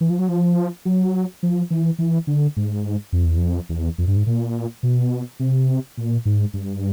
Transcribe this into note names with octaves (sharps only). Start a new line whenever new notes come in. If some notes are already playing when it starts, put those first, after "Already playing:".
E3
F3
F#3
F3
F#3
F3
E3
E3
D3
G#2
F2
E2
F2
E2
F2
G2
G#2
A#2
B2
C3
A#2
G#2
G2